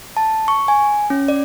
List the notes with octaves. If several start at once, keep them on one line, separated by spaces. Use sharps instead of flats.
A5
C#6
G#5
C#4
D5